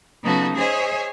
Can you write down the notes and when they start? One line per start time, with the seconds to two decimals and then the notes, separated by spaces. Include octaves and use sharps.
0.22 C#3 F#3 B3 D#4 F#4 A4
0.56 G#4 C5 C#5 D#5 E5 G#5